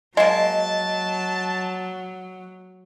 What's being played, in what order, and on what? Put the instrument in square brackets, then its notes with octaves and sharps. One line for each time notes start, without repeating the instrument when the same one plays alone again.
[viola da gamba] F#3 [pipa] G#3 A#3 [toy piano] D#5 [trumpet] A5